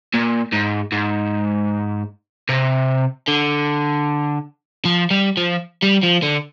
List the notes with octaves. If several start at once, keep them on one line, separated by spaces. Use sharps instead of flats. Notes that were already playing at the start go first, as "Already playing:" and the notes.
A#2
G#2
G#2
C3
D3
F3
G3
F3
G3
F3
D3